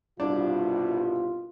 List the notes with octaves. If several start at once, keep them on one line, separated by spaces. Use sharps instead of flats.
C2 G2 B2 D4 F4